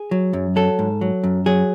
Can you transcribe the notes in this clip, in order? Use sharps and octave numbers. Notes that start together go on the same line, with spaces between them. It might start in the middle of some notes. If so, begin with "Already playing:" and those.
Already playing: G#4
F#3
F#2
F#3 A4
G#2
F#3
F#2
F#3 G#4